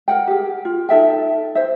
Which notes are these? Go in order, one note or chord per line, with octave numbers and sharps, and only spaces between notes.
A#4 F#5 G5
G4 G#4
F4
D#4 A4 E5 G5
C5 E5